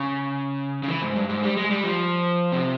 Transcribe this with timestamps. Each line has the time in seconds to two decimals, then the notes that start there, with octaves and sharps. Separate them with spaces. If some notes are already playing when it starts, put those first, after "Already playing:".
Already playing: C#3
0.83 C#3
0.88 E3
1.02 G#2
1.16 G2
1.29 G#2
1.43 G3
1.57 G#3
1.70 G3
1.84 F3
2.52 C3